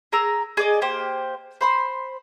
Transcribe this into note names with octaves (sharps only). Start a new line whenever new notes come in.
G#4 A#4 A#5 E6
G#4 D5 D#5
A#3 G4 C5
C5 B5 C6